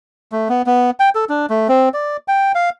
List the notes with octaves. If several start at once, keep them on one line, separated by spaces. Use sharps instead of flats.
A3
B3
B3
G5
A4
D4
A3
C4
D5
G5
F5